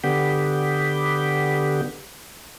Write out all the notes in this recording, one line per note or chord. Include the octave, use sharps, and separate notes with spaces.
D3 B3 G4